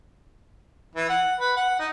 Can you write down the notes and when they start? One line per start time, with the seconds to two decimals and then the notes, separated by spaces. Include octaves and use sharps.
0.95 E3
1.09 F#5
1.40 B4
1.56 F#5
1.79 D#4